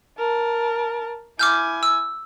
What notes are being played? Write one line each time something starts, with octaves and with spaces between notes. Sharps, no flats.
A#4 A5
E4 G#5 D6 F6 G6
E6